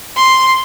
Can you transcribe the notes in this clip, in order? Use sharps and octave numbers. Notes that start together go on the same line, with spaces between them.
C6